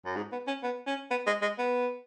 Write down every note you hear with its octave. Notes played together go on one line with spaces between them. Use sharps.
F#2
G#2
B3
C#4
B3
C#4
B3
G#3
G#3
B3